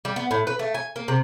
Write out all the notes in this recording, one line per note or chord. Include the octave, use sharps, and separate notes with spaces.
G3
B3
A2
B4
A3
G#5
A#3
C3